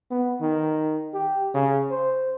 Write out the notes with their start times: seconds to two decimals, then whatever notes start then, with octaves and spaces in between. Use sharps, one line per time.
0.11 B3
0.41 D#3
1.14 G4
1.54 C#3
1.91 C5